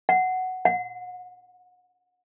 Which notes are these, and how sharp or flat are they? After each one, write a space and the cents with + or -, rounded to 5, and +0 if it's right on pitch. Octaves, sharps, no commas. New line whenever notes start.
F#5 +5
F#5 -35